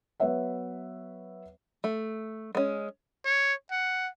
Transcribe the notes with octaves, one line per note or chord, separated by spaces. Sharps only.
F#3 B3 B4 C#5 E5 F#5
A3
G#3 C#4
C#5
F#5